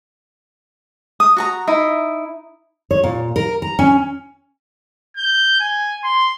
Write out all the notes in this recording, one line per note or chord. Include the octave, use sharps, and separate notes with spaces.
D#6
F#4 A5 A#5
D#4 E4 E5
C#5
A#2
A#4
A#5
C#4
G6
G#5
C6